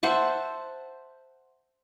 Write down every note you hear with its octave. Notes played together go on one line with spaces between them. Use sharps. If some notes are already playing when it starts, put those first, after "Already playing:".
C5 E5 F#5 A5